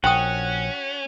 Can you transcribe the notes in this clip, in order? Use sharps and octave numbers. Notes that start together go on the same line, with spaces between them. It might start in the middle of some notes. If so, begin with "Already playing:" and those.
A#1 C#4 F#4 F#5 G5 D#6